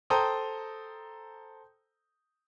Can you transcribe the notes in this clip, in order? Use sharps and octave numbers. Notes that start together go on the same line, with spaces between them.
A4 C5 G5 A#5 D#6